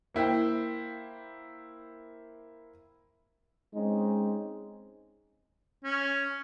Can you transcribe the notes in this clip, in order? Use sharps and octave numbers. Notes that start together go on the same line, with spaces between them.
A#3 E4 C5 G5
G#3 C4 C#4 D#4
C#4